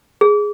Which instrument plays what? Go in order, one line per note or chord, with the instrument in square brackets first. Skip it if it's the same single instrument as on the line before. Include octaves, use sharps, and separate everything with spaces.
[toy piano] G#4